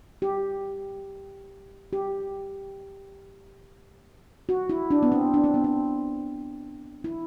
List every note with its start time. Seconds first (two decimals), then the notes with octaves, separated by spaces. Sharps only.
0.22 G4
1.93 G4
4.49 F#4
4.70 E4
4.91 D4
5.03 B3
5.12 C4
5.34 D4
5.44 C4
5.54 B3
5.64 C4
7.04 E4